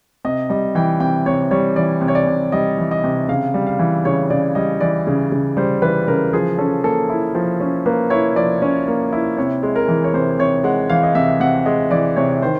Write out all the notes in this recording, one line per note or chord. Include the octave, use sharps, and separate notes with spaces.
C3 D#5
G3 D#5
E3 G5
C3 G5
C3 C#5
G3 C#5
E3 D5
C3
C#5
D5
C3
G3 D#5
E3
D#5
C3
C#3 F5
G3
F5
E3
C#3 C#5
C#3 D5
G3 D#5
E3 D5
C#3
C#3
G3 C5
E3 B4
C#3 A#4
F3 G#4
C#4 A4
A#3 A4
E4
F3
C#4
A#3 B4
E4 C#5
F3 D5
C#4
A#3
E4
C3 C#5
G#3
A#4
E3
C#5
C3 C5
C3 C#5
G#3 F#5
E3 F5
D#5
C3 E5
C3 F#5
G#3 D#5
E3 D5
C3 C#5
D#3 C5